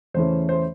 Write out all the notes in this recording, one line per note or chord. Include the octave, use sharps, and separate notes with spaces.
E2 C#3 E3 A3 C#4 C5
C5